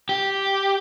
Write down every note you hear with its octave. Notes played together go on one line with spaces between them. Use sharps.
G4